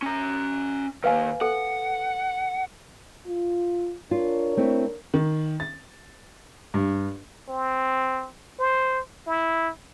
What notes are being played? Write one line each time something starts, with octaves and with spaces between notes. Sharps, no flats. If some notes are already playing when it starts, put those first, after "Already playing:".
C#4 A#5
D#3 A#3 B4 F5 G#5
A4 F#5
F4
D4 F4 A#4 C#5
A3 C4 E4
D#3
A6
G2
C4
C5
E4